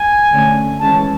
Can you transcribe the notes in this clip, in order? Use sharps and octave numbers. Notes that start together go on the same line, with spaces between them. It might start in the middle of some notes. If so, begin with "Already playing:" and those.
Already playing: G#5
D3 A3 C#4
E3 G#3 C#4 A5